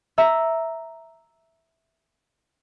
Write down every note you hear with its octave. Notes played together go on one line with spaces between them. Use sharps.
E5 A#5